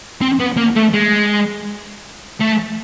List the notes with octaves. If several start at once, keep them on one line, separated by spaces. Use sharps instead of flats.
C4
B3
A#3
A3
G#3
A3